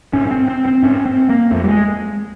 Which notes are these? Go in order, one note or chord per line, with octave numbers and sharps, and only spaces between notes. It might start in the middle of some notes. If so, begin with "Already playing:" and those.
G#2 C#4
C#4
C4
C4
C4
G#2 C#4
C4
A#3
F2 A3
G3
G#3